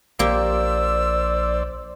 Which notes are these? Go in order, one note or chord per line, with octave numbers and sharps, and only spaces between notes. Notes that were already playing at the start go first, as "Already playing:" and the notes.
A#1 A#3 G4 C5 D5 E6